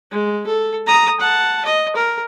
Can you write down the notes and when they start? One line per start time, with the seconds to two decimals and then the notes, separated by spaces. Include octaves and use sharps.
0.12 G#3
0.47 A4
0.87 A#5 D#6
1.20 F#5 A5
1.65 D#5
1.96 A#4